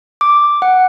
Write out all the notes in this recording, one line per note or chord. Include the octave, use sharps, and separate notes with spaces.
D6
F#5